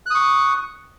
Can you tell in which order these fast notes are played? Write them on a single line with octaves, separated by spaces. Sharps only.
F#6 D#6 C#6